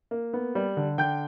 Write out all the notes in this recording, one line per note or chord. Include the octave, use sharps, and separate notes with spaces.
A#3
B3
G3
D3
D3 G5 G6